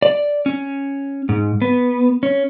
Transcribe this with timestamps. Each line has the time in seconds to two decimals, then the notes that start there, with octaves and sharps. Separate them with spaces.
0.02 D5
0.46 C#4
1.29 G#2
1.62 B3
2.23 C#4